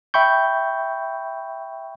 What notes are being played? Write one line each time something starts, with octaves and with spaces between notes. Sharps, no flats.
E5 G5 B5 C#6 G6